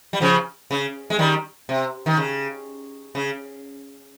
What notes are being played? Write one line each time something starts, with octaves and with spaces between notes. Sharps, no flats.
G3
C#3 F3
C#3
G#3
D#3 G3
C3
D#3
C#3
C#3